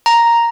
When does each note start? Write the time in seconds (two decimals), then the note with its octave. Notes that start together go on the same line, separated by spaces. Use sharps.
0.06 A#5